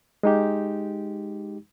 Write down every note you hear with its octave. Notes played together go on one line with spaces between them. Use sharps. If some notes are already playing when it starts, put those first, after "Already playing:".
G#3 D#4 G4